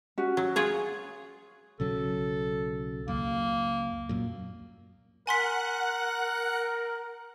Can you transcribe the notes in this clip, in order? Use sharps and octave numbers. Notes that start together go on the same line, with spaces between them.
C#4 F#4
F#3
F4 G#4 C#5
B1 C#3 F#3 A4
C#2 F#2 A#3
F#2 A#2
A#4 F#5 G#5 C6 F#6 B6